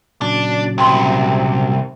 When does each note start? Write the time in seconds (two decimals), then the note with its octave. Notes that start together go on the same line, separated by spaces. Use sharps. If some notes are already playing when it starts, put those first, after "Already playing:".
0.22 A#2 C#3 F#3 D4
0.78 C2 C3 G5 C6